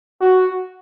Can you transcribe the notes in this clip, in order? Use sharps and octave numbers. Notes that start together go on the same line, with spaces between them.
F#4